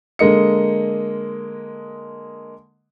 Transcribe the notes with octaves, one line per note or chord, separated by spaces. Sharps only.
D3 G#3 A#3 D#5 C#7